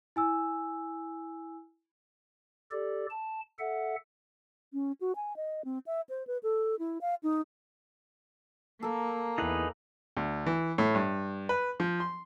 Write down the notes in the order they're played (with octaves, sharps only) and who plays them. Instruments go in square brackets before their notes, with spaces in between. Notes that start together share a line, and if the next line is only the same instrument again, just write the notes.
[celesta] E4 G#5 E6
[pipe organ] G4 A4 D5
A5
A4 E5 F#5
[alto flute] C#4
F#4
G#5
D#5
C4
E5
C5
B4
A4
E4
F5
D#4
[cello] A#3 [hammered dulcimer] A4 A#4
[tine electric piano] E2 E4 [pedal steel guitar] D#4 G#4 B4
[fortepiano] D2
E3
A2
G2
B4
F3
C6